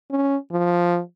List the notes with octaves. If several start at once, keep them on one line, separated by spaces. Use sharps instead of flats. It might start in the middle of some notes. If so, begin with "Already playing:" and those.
C#4
F3